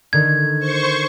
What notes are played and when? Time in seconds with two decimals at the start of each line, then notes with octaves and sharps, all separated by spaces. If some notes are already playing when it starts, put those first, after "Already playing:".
0.13 D3 D#3 A#4 G#6
0.59 C5 C#6